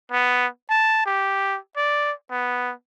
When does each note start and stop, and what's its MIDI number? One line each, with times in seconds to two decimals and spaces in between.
0.12 0.47 59
0.70 1.03 81
1.06 1.57 67
1.77 2.12 74
2.31 2.72 59